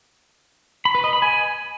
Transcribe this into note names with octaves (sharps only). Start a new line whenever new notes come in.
B5
B4
D#5
B5
G#5